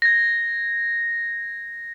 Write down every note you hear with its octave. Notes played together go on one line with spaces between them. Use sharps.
G#6 A#6